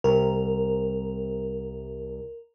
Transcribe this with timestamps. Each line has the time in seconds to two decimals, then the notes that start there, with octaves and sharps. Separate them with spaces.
0.04 C2 A#4